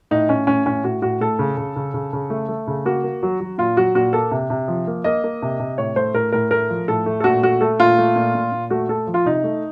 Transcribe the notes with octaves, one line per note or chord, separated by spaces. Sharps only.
A2 D#4
A2 C#4
A2 C#4
A2 C#4
A2 F#4
A2 F#4
A2 A4
C#3
C#3
C#3
C#3
C#3
A3
A3
C#3
A#3 F#4
A#3
F#3
F#3
A#2 F4
F#3 F#4
A#2 F#4
A#3 A4
C3
C3
F3
A#3
A#3 D#5
A#3
C3
C3
A2 C#5
A3 C5
A2 A#4
A2 A#4
A3 A#4
F3
A2 A4
A3
A4
A#2 F#4
A3 F#4
A3 A4
A#2 F4
A3
A#2
A#2
A#2
A3 F#4
A3 A4
F3
F4
C3 D#4
A3